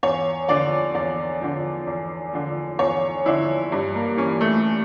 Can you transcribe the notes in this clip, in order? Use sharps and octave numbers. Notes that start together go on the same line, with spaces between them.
E2 C#5
D3 F3 D5
E2 D5
D3 F3
E2
D3 F3
E2 C#5
D3 F3 E4
G2
A#3
E3 C#4
A3